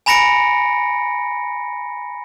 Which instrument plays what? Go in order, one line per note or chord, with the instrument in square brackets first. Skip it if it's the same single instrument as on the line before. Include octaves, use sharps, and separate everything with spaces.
[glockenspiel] G#5 A#5 B5 A#6 C#7 D7